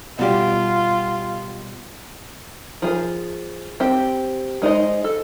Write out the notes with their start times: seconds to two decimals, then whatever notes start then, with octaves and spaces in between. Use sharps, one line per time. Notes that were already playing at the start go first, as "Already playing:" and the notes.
0.19 B2 G3 F4 G4
2.82 F3 G#4 A#4
3.80 C4 G4
4.62 G#3 D#4 C5 D#5
5.04 A4